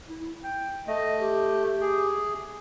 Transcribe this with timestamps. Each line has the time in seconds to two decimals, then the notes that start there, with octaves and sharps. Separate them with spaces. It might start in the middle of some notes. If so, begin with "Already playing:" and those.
0.09 E4
0.44 G5
0.87 A3 D#5
1.20 G4
1.81 G#4